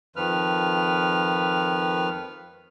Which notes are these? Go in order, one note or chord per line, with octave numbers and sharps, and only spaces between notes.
F2 D#3 F3 B4 F6